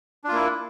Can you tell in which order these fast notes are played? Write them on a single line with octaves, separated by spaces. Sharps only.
D4 F4 A#3 E4